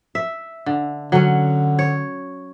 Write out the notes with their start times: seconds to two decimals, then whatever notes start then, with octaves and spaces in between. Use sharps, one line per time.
0.15 E5
0.66 D3
1.12 D3 F#3 C#4
1.79 C#5